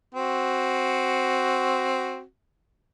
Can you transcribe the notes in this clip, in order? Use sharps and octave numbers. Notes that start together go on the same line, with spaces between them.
C4 F#4